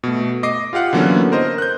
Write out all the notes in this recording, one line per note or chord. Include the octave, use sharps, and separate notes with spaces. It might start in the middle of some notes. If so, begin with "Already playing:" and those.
B2 A3
D#5 D6 C7
F4 G4 F5 F#5
D3 E3 F#3 A#3 B3 C#4
A#4 C5 D#5
F#6 G6